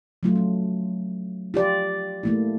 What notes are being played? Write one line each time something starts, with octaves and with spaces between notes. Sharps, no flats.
F#3 A3 F4
C#4
F4 G4 D5
A3 A#3 E4